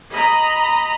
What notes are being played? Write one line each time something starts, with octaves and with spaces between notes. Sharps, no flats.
D#5 A#5 B5